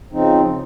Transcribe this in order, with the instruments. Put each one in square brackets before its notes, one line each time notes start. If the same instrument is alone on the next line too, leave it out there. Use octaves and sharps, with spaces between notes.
[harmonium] C#3 F3 C4 D#4